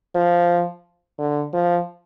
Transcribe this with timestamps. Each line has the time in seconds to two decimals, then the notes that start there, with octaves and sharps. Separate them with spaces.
0.15 F3
1.19 D3
1.54 F3